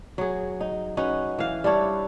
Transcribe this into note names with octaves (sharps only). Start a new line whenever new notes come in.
F#3 G#4
D#4
C#4 D#4 F#4 B4
E3 F5
G3 D4 E4 C#5